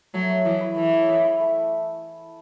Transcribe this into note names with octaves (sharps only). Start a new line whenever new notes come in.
F#3 A3
C#5
E3 G#4
E4
E3 A3
C#5
G#4
E4
A3